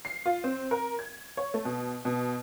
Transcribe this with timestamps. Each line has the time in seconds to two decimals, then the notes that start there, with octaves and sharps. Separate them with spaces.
0.05 C7
0.26 F4
0.44 C4
0.71 A#4
0.99 G#6
1.37 C#5
1.54 A3
1.65 B2
2.05 B2